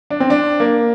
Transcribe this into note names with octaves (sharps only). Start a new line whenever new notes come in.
D4
C4
D4
A#3